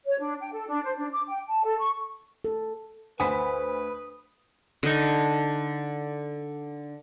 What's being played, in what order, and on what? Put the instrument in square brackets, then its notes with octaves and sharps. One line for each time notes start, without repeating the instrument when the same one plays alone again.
[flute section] C#5
D4
G5
A4
D4
C5
D4
D6
G5
A5
A4
C#6
[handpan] A4
[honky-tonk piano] D2 B5 B6 [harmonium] B4 [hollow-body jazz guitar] C5 F#5 G#5 [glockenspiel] D#6
[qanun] D3 D#4